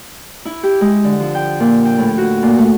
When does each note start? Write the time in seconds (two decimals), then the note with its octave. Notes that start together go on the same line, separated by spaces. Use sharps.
0.45 E4
0.63 G4
0.81 G#3
1.04 D3
1.20 F3
1.35 G5
1.60 A#2
1.85 G5
1.98 A2
2.18 F#4
2.43 A#2
2.58 A3